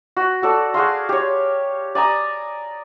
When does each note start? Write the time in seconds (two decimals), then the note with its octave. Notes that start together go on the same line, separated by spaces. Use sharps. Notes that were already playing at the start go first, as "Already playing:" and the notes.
0.17 F#4
0.42 F#4 A4 D5
0.74 F#4 G#4 F5 C6
1.09 G4 C#5
1.95 D5 G#5 A#5 D#6